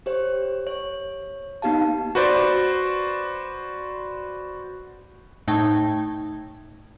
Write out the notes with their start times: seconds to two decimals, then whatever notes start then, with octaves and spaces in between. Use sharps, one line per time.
0.06 G4 C5 C#5
0.67 C#5
1.62 A#3 B3 D#4 G4 F5 A5
2.15 F#4 B4 C5 D5
5.48 A2 A3 D#4 G5 A5 G#6